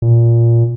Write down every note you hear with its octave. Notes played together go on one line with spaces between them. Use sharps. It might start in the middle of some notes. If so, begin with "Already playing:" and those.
A#2